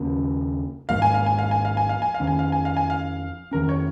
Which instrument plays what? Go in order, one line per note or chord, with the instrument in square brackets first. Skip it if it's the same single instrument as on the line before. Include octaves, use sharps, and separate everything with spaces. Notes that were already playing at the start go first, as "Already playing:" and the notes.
Already playing: [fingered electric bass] D#2 C#3 A#3 C#4
[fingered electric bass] G#1 G#2 F3 A#3 [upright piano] F5
[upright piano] G#5
F5
G#5
F5
G#5
F5
G#5
F5
G#5
F5
[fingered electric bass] F2 D#3 C#4
[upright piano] G#5
F5
G#5
F5
G#5
F5
[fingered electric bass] F2 D#3 C#4 [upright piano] A#4
[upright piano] C#5